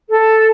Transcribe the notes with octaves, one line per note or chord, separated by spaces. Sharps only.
A4